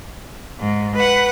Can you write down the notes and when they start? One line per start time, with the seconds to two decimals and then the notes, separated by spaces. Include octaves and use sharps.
0.59 G#2
0.95 B4 F#5